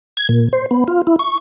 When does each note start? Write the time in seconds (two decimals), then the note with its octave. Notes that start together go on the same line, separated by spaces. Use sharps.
0.17 G#6
0.29 A#2
0.53 C5
0.71 B3
0.88 F4
1.07 E4
1.19 C#6